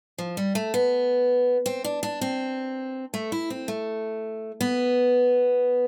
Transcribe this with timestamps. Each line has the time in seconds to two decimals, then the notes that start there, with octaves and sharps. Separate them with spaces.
0.18 F3
0.37 G3
0.55 A3
0.74 B3
1.66 C4
1.84 D4
2.03 D4
2.21 C4
3.14 A3
3.32 E4
3.50 C4
3.68 A3
4.61 B3